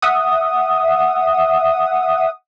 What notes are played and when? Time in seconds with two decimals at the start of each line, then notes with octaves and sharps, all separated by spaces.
0.02 E5 F#5 D#6